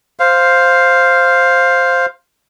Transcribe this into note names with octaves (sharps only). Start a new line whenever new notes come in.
C5 F5